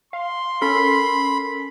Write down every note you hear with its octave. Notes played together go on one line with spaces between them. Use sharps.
F5 C6
C#4 A4 A#4 B5